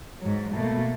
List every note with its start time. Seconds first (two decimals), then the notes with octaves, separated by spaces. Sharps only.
0.21 G#2 F#3
0.53 B2 A3 A#3